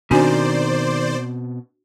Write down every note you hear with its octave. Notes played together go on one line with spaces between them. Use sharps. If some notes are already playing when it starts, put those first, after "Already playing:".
B2 D#3 C4 D4 F#4 C5 D5 G#5